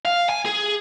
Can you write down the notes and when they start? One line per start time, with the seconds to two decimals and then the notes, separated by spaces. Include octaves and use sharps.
0.05 F5
0.30 G#5
0.46 G#4